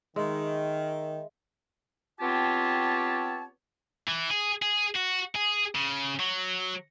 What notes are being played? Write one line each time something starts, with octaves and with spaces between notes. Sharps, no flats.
D#3 G#3 D#5 E5
B3 C4 F4 G4 C#5 A5
E3
G#4
G#4
F#4
G#4
C#3
F#3